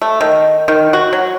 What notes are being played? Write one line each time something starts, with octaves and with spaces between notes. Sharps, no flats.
A3
D#3
D#3
F#4
F#3